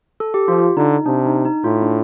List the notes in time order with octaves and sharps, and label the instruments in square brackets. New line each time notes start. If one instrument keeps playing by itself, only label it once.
[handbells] A4
G4
[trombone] F3 [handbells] F4
[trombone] D3 [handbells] D#4
[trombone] C3 [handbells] D4
[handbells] D#4
D#4
[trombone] A2 [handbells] F4
[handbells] D4